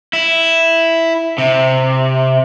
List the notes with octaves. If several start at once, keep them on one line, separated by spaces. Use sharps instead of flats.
E4
C3